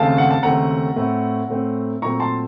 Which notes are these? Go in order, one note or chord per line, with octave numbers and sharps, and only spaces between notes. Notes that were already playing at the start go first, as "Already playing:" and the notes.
Already playing: D#2 C#3 A3 C4 F5 A5
F#5
A5
D#2 C#3 A3 C4 F#5 A#5
A2 A3 C4
A2 A3 C4
A#2 F#3 A3 C4 A#5 C#6
A5 C6